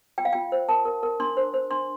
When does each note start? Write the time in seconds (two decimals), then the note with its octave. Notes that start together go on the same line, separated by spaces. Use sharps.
0.18 F4 G5
0.25 F5
0.33 F4 G5
0.52 C5
0.69 A#4 A5
0.85 A#4
1.03 A#4
1.20 D4 C6
1.37 C5
1.54 C5
1.71 D4 C6